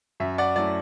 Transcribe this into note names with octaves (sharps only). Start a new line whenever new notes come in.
F#2 E5
D5 F#5
F#3 A3 E4 D5